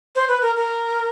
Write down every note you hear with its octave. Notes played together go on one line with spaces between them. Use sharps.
C5
B4
A#4
A#4